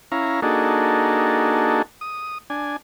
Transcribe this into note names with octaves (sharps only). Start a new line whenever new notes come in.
C#4 E4 F5 A#5
A#3 D4 D#4 F#4 G#4 A4
D#6
D4 G#5